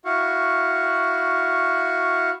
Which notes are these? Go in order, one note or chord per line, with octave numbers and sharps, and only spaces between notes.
E4 F#4 F5 C#6